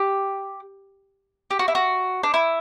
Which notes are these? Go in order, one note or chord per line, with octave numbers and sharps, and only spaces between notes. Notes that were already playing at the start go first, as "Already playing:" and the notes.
Already playing: G4
G4
F#4
E4
F#4
D4
E4